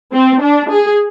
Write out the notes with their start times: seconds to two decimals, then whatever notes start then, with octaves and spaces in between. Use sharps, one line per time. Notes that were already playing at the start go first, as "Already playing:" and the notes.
0.13 C4
0.42 D4
0.69 G#4